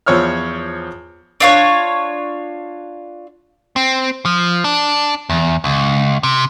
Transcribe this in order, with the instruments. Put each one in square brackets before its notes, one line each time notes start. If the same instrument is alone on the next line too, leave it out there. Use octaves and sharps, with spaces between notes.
[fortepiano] E2 F3 C#5 E6 F6
[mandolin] D4 F4 C#5
[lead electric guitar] C4
F3
D4
E2
C#2
C3